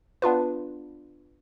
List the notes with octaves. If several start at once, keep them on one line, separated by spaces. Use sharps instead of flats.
B3 D4 F4 B4